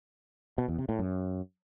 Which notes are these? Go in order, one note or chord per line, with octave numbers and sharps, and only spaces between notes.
B2
E2
C3
A2
F#2